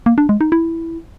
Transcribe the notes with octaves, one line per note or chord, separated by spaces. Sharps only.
A#3
D4
G#3
D#4
E4